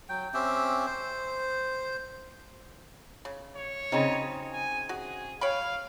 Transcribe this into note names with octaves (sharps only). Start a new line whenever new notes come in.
F#3 G5
C4 C#4 G4 E5
C5
C#3
C#5
C#3 F#3 C4 D#4
G#5
F#4 G#4
C#5 F5 G5 B5